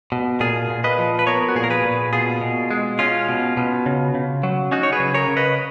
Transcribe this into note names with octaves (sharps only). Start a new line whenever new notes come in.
B2
A#2 F4 G#4
A#2
B4 D#5
F3
B4
B3 A#4 C#5
F#4
A#2 G#4
A#4
G#4 B4
A#2
B2 F4 G#4
B2
G#3
C#4 F4
B2
B2
C#3
C#3
F#3
C#4 D#4 F#4
C#5
G#4 B4
C#3
A#4 C#5
C#3
B4 D#5